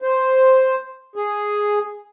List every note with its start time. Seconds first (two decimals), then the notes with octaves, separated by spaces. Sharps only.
0.02 C5
1.16 G#4